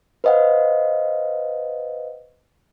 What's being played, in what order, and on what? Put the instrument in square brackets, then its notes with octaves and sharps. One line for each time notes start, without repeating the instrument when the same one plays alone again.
[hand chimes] B4 C5 D#5 F5 F#5